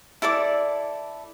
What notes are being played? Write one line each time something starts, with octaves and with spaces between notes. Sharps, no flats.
E4 A4 D5 D6